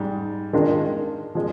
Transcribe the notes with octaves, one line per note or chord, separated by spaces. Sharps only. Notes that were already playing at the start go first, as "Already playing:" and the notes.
Already playing: G#2 G3
D#3 G#3 D4 F4 A#4
F3 G#3